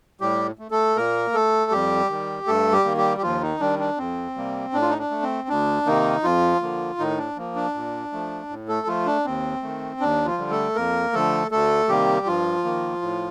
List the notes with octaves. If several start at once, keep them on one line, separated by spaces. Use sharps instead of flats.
A2 G3 G4
A3
A3 A4
A#2 A#3 A#4
A3 A4
F2 G3 G4
D#3 G3
G2 A3 A4
G3 G4
D#3 A#3
G3 G4
G4
D#2 F3 F4
D#3 D#4
D#3 G3 D4
D4
F2 C4
C3 G3 A#3
A2 D4
F4
D#4
D4
A3
C4
D2 D4
C3 D#3 A#3 D#4
F2 F3 F4
D3 F3 A#3
A2 D#3 D#4
D4
F3 A#3
D4
A#2
F3 A3
A2
A3 A4
F3 A3 F4
D4
D#2 C4
D#3 A3
D#2 D4
F3 F4
D3 G3
A3 A4
F2 A#3 A#4
D3 F3 A3 A4
D2 A3 A4
C3 D#3 G3 A#3 G4
G2 F3 F4
D#3 A#3
A2